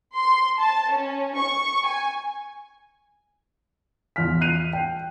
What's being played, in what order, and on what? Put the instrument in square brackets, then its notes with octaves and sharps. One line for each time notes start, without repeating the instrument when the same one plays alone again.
[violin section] C6
A5
C#4
C#6
G#5
[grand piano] E2 F4 F6 B6
F#6 C7 D#7 F7
G5